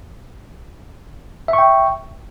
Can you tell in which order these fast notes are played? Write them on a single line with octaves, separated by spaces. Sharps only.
E5 C#6 G5